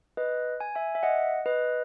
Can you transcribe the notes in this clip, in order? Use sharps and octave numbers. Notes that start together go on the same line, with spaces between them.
B4 D#5
G#5
E5 G#5
E5
D#5 F#5
B4 D#5